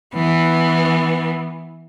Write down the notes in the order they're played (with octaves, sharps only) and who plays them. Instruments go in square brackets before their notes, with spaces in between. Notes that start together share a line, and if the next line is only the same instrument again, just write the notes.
[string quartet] E3 B3